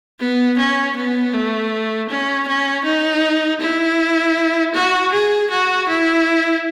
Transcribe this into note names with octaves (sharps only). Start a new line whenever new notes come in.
B3
C#4
B3
A3
C#4
C#4
D#4
E4
F#4
G#4
F#4
E4